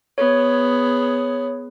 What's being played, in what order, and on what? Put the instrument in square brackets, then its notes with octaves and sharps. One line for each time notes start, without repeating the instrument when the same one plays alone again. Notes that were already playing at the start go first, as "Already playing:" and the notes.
[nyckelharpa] B3 G#4 [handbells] C#5